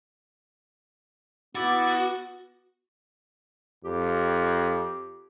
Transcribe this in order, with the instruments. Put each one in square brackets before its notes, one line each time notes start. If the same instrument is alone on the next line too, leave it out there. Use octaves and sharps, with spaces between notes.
[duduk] B3 [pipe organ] E4 D6 A6 [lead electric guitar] F#4
[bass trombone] F2 [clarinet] G4